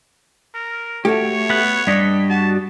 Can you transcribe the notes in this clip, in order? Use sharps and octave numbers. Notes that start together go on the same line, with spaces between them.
A#4
A3 F#4 G4 C#5
B3 F#5
G2 G3 D4 D#5 B6
F#4 A5